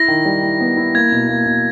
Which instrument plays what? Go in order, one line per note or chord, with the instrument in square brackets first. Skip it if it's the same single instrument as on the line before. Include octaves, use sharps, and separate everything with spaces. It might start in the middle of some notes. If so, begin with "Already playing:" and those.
Already playing: [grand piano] E4 [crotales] A#6
[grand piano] D#3
G3
E4
B3
E4
[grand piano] A#3 [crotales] G#6
[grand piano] B2
A#3
B2